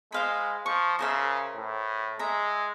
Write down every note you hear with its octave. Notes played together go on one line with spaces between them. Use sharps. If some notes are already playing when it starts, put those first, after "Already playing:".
G#3 C5 F5 B5
F3 C#6
C#3 A#4 C5 E5
A2
G#3 E5 A#5